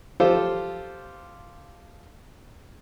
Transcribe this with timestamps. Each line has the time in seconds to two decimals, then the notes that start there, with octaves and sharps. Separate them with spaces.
0.20 F4 G4 A4 C5